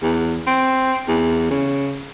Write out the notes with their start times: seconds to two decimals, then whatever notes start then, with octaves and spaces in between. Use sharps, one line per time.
0.03 E2
0.47 C4
1.08 E2
1.51 C#3